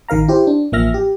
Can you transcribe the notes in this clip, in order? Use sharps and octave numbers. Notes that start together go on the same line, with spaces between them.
A1 D#3 A#4 F5 A#5
E4 G4 C5
D4
A1 F3 A#3 E5 F6 A#6
G4